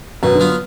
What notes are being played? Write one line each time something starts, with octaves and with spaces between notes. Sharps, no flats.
F#2 B2
D3
F#3 B3 F4